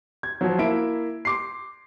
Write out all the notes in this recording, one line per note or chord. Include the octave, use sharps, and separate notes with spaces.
G#6
F3 F#3
A#3 E4 E5 D7
C6 D6 C7